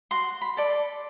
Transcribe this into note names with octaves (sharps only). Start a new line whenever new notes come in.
F#4 C6
B5
A4 D5